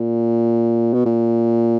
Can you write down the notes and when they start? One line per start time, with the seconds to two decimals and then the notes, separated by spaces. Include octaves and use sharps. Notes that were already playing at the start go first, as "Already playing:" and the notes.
Already playing: A#2
0.94 B2
1.06 A#2